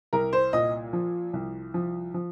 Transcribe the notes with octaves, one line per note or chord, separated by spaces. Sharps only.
C2 A#4
C5
A#2 D#5
F3
C2
F3
F3